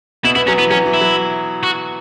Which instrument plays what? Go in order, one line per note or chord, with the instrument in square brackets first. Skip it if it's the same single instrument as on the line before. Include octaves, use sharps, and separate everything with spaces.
[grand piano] B2 B3 [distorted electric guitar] E4
[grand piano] B2 B3 [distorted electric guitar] E4
[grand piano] F#3 [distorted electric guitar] C#4
[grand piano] E3 [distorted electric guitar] B3
[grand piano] F#3 [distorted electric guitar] C#4
[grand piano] E3
[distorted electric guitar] E4
[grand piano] F#3
[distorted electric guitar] F#4